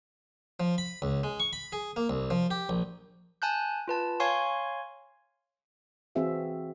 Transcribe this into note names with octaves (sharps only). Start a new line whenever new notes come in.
F3
B5
C#2
G#3
C#6
B5
G#4
A#3
C2
F3
G4
A#1
G#5 A5 F#6 G6
F4 B4 A5
C#5 F5 G#5 C6 C#6
E3 C4 F#4 G#4 E5 F5